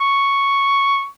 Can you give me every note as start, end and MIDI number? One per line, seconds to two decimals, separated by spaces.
0.01 1.06 85